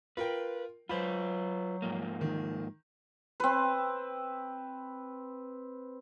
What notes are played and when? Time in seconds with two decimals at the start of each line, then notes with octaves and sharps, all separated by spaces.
0.17 F4 A#4 B4 G5
0.89 F#3 F4 B4 C5 B5
1.82 G#2 F3 A#3
2.21 D#3
3.40 C4 B4